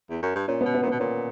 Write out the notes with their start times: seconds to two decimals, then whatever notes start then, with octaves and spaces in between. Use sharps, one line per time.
0.10 E2
0.22 F#2
0.36 G2
0.48 A#2 C#4
0.61 B2 B3
0.74 B3
0.83 A#2
0.87 B2 B3
1.00 A#2 C#4